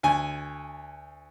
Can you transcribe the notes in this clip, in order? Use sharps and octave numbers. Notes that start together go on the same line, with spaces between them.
D2 G#5